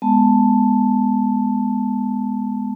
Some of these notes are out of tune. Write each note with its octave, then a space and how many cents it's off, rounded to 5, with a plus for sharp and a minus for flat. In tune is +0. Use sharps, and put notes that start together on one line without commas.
G#3 +0 B3 +0 A5 +0